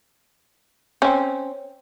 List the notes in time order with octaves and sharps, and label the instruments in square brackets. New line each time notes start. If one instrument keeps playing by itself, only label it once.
[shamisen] C4 C#4